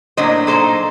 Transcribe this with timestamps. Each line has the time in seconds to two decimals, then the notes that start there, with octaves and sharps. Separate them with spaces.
0.17 A2 F#3 A#3 D4 C5 D#5
0.47 A#2 F#3 A#3 D#4 A4 C5